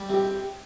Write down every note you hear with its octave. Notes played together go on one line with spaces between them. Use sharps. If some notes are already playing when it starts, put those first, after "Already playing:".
Already playing: G3
C3
G4